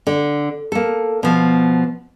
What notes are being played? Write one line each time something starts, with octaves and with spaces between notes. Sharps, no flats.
D3
A#3 A4
B2 F3